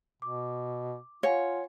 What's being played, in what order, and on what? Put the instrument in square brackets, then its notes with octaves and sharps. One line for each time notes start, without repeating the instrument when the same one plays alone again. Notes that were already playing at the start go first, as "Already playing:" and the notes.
[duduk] B2 [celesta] D6
[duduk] F4 [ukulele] C#5 [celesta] F5 F#5 G#5